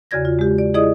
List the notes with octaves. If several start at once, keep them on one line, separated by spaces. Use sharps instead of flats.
E2 C#3 F#4 D5 G#6 A#6
F4
G#3 G4
D5
E4 G#4 D5 D#5 D#6